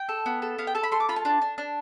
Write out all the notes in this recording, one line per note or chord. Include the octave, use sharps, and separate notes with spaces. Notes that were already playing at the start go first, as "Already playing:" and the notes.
Already playing: G5
A4
B3
A4
B3 F5
G5
A4 A5
B5
A3 C6
D6
F4 B5
A5
D4
D4
D4